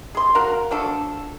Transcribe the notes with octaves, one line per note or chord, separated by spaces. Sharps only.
G#4 C6
F#4 A#4 F5
F3 D4 F#4 A4